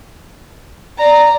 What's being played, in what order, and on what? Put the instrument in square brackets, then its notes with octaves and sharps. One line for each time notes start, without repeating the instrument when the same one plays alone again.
[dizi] D5 [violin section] A#5